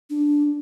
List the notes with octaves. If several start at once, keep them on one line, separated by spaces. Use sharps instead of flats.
D4